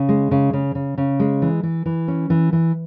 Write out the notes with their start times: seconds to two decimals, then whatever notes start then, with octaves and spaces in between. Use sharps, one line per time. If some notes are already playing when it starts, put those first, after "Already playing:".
Already playing: C#3
0.09 G#3
0.31 C#3
0.53 C#3
0.75 C#3
0.98 C#3
1.20 G#3
1.42 E3
1.63 E3
1.86 E3
2.08 C#4
2.30 E3
2.53 E3